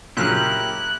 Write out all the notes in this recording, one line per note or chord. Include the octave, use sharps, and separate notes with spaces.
A#2 C#3 F#3 E4 G4 A#4 F#6